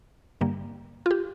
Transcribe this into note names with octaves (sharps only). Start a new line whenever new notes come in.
G2 D3 G3 A#3
F4
G4